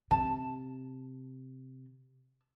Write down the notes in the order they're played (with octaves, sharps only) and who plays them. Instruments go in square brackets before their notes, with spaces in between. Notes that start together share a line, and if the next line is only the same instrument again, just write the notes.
[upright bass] C3 [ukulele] A5